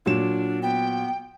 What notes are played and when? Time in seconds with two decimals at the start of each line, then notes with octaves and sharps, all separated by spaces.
0.06 A#2 F#3 D4 E7
0.62 B3 G5